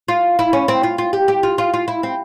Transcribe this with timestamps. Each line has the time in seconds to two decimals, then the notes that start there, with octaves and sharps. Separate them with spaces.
0.08 F4
0.39 E4
0.53 C#4
0.68 C4
0.83 F4
0.98 F4
1.13 G4
1.28 G4
1.43 F4
1.58 F4
1.74 F4
1.88 E4
2.03 C4